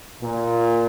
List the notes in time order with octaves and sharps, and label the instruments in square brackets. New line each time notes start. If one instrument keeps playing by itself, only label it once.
[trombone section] A#2